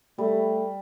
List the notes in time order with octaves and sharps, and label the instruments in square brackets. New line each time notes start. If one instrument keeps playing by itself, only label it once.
[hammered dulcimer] G3 [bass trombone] A3